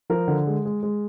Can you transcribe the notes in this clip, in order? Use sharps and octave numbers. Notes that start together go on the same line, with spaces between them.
F3 A#4
D3
G#3
G#3
G#3